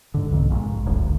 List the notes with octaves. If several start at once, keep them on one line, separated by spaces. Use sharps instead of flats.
G#2 D3
B1 F2 C3
A#1 G#2
D1 G#1 D2